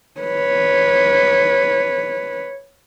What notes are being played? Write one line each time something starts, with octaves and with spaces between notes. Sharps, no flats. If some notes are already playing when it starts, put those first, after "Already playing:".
B4 C#5